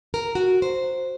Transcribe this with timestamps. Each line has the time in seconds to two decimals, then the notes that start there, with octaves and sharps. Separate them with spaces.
0.14 A#4
0.35 F#4
0.62 C5